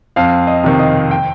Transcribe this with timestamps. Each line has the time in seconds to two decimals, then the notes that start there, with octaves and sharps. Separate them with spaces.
0.16 F2 F5
0.47 D#5
0.64 C3 D#3
0.79 D#5
1.11 G5